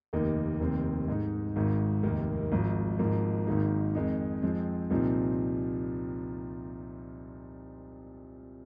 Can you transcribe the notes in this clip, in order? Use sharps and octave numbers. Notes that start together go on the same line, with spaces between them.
F1 D#2 D#3 A#3 D#4
F1 D#2 D#3 C4
G#2 G#3 D#4
G#1 G#2 D#3
F1 D#2 D#3 A#3
G#1 G#2 F3
G#1 G#2 F3 A#3
G#1 G#2 D#3 A#3 D#4
F2 D#3 G#3 D#4
F2 F3 G#3 C4
C2 A#2 F3 C4 D#4